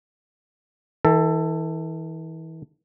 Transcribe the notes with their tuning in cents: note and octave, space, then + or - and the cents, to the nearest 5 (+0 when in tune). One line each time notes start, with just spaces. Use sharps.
E3 -35 A4 +15